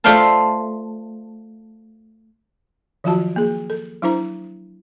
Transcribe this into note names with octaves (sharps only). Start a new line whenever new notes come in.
A3 F4 C5 D5 F5 A5
D#3 F3 F#3 F4 F#4 A5
A#3 G#4
A4
F#3 D4 E4 C5 A#5